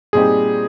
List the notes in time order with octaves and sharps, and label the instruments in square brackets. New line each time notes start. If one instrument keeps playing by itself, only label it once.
[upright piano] A#2 G3 C4 D#4 G4 [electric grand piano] G#4